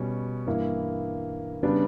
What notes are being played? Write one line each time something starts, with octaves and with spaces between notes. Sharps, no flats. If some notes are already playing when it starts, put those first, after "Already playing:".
Already playing: B2 G3 C#4
G2 E3 A#3 E4
C#3 G3 B3 D4